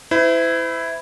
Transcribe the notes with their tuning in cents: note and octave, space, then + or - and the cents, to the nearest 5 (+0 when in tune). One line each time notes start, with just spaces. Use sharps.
E4 +0 C5 -45